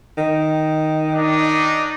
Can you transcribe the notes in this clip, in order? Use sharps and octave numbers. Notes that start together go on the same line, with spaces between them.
D#3
D4 D#4